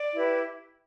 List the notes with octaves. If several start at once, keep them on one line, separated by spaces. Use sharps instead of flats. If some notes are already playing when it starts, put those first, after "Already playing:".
Already playing: D5
E4 G4 B4